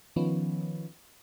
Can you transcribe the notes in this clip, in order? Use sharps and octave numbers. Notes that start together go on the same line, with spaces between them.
D#3 F3 B3 C#4